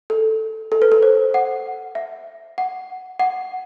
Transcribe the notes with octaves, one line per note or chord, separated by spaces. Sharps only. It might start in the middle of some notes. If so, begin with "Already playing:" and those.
A4
A4
B4
A4
C5
F#5
E5
F#5
F#5